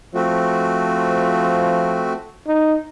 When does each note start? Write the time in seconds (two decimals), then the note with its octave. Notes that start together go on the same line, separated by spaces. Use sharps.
0.15 F3 A3 C4 F#4
2.47 D#4